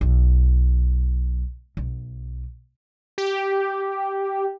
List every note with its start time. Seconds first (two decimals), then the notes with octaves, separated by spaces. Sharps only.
0.01 B1
1.77 B1
3.18 G4